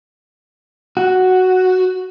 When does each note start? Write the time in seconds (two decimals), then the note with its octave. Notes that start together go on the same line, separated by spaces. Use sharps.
0.97 F#4